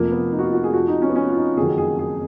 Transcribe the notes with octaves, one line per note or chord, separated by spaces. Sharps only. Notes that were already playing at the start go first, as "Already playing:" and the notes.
Already playing: F1 F2 F3 A#3
B3
D#4
F#4
F4
F#4
G#4
F2 F3 F#4
D#4
C#4
B3
C#4
F4
D#4
F#1 F2 D#3 F#3 G#4
G#4
G#4